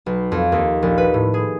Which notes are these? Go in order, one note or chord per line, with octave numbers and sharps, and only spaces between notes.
B1
F2
D#2
A#1
B4
A2
G#4